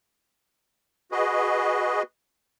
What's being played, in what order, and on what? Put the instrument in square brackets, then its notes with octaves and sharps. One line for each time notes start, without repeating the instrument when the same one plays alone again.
[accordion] F#4 G#4 B4 D#5